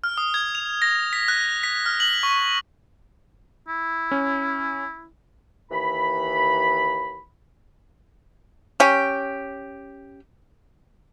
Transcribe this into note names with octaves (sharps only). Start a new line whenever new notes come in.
F6
D#6
G#6
F7
A#6
B6
F#6
B6
F6
F#7
C#6
E4
C#4
D#2 E3 B5
C#4 G4